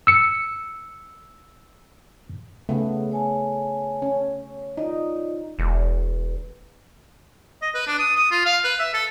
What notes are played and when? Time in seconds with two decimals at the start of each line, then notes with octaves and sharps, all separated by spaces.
0.07 E6 C#7
2.69 C#3 A3 B3
3.11 C#5 G#5 A5
4.02 C#4
4.77 D#4 F4 D5 D#5
5.59 E1
7.62 D#5
7.75 B4
7.87 D4
7.99 D#6
8.16 D#6
8.31 F4
8.46 F5
8.64 B4
8.80 E5
8.94 A4